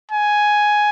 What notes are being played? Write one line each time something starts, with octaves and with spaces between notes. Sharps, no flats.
G#5